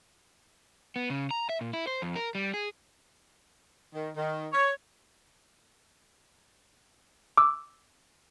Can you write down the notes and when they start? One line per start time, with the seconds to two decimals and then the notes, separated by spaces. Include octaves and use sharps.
0.96 B3
1.10 C#3
1.31 A#5
1.49 E5
1.61 A#2
1.73 E4
1.87 C5
2.02 F2
2.16 A#4
2.35 G3
2.54 G#4
3.93 D#3
4.15 D#3
4.52 C#5
7.37 D6 E6